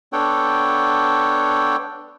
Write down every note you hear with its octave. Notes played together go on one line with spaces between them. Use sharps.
B3 D4 A4 C#5 F#5 G5